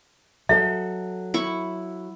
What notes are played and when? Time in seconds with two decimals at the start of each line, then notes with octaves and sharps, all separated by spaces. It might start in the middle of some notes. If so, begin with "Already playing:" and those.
0.49 F#3 A4 D#5 E5
1.34 E4 C#6